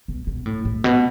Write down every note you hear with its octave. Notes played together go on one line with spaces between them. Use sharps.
B2
B2
A2
A2
B2